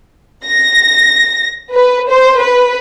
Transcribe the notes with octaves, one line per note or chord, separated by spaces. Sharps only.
A#6
B4
C5
B4